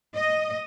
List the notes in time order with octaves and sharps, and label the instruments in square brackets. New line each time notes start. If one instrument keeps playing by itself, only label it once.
[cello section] D#5